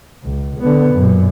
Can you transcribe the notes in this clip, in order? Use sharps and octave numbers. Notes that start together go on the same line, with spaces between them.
C#2
D3 B3
F#2 A#2